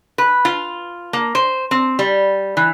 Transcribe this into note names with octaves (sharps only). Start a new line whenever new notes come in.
B4
F4
A#3
C5
C4
G3
E3